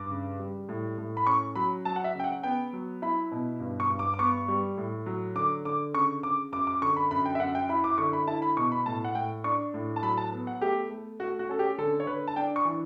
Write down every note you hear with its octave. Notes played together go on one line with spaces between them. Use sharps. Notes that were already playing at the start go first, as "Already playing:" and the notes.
Already playing: G2 D6
C#3
G3
A2
A2
B5
C#4 C#6
F#3 B5
F#3 A5
F#5
E5
C#3 G5
F#5
B3 G5
F#3
E4 B5
B2
G2
C#6
G2
D6
D6
B3 C#6
G3
A2
F#3
D3 D6
D3 D6
C#3 C#6
C#3 D6
F#2 D6
D6
D3 C#6
B5
F#2 B5
G5
E5
F#2 F#5
G5
E4 B5
D6
D3 C#6
B5
E4 A5
B5
B2 C#6
B5
A2 A5
F#5
A2 G5
D4 C#6
A2
A5
F#3 B5
A5
B3
F#5
A3 G4
A3
A3 F#4
F#4
C#4 A4
G4
D3 A4
C#5
D3 B4
A5
D4 G5
C#6
E3